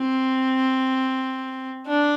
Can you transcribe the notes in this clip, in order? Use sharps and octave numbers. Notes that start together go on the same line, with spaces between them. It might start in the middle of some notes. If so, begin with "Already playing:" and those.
Already playing: C4
D4